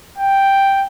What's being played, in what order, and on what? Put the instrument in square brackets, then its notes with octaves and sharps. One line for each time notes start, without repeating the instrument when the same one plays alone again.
[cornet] G5